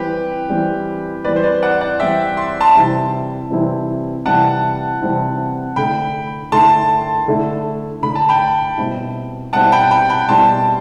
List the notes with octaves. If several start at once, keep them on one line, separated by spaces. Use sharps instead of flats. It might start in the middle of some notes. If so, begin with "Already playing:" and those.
Already playing: E3 G3 C4 G4 B4
E3 G3 C4
E3 G3 C4 B4 D5
C5
B4 D5
D5 F#5
D5 F#5
E3 G3 C4 E5 G5
C6
A5 C6
C3 E3 G3 C4 E4
C3 E3 G3 C4 E4
C3 E3 G3 C4 E4 F#5 A5
C3 E3 G3 C4 E4
D3 A3 E4 G5 B5
D3 A3 E4 A5 C6
D3 A3 E4
D3 A3 E4 B5
A5
G5 B5
B2 G3 C4 E4
B2 G3 C4 E4 F#5 A5
G5 B5
G5 B5
G5 B5
B2 G3 C4 E4 A5 C6